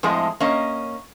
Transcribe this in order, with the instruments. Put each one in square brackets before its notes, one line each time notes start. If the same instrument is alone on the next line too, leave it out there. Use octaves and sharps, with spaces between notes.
[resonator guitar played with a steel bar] F2 A2 G#3 G#4
A#3 C#4 D#5